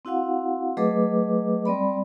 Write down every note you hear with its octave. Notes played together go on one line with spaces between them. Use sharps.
C4 E4 F#4 F5 F#5
F#3 A3 G#4 B4 D#5 D6
G3 C4 D5 B5